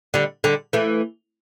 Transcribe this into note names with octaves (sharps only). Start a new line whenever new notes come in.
D3 G3
D3 G3
E3 A3